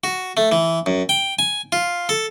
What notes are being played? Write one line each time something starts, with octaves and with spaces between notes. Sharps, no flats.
F#4
A3
E3
F#2
G5
G#5
F4
A4